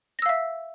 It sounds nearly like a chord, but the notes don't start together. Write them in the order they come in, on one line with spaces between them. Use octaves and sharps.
A#6 E6 F5 E5